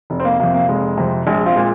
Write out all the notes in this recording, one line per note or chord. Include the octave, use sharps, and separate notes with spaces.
F1
C4
A#3
F2 C3 A#3
A#3
F1 G#3
F2 C3
A#1 G#3
C4 F4
A#2 G#3